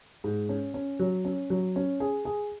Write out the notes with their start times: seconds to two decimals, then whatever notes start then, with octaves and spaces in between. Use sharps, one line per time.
0.24 G#2
0.49 C#4
0.74 C#4
1.00 F#3
1.25 C#4
1.50 F#3
1.76 C#4
2.00 G#4
2.25 G#4